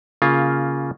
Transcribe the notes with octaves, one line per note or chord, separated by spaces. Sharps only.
C#3 A#3 F4